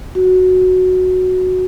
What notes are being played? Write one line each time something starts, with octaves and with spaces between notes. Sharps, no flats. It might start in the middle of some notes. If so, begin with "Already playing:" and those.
F#4